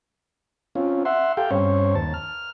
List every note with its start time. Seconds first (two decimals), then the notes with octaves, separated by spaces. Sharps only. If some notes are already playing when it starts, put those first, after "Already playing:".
0.75 C4 C#4 F4
1.05 E5 F#5 C6
1.37 G4 A4 F5 G5
1.51 G2 C4 C#4 C5 C#5
1.95 D#2 A5
2.14 F6